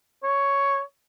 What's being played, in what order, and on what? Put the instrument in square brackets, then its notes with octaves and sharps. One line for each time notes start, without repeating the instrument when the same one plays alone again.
[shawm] C#5